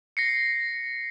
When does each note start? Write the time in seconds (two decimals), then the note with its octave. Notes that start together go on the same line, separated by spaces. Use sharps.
0.17 A#6 C7 C#7